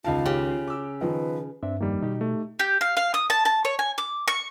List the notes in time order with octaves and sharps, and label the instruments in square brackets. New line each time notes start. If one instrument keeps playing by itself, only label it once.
[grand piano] C#2 D#3 [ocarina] F4 [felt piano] D#5 F5 A5
[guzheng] C#3 [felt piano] G4
[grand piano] D6 E6
[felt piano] D#3 F3 [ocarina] B4
[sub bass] G2 [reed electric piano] C4 D4 E5
[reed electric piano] F2 A#3 [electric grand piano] D#3 G3
[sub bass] B2 [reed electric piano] D#4 G4
[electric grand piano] A3
[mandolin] G4
F5
F5
D#6
A5
A5
C#5
G#5
D6
C#6